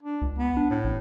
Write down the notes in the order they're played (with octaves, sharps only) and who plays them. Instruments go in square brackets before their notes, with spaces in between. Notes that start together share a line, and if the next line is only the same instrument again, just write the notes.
[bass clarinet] D4
[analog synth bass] C#2
[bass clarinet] B3
[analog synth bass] D4
[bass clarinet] A2
[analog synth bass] A1